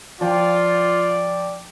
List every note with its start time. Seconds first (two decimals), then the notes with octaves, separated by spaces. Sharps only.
0.21 F3 F4 D5 G5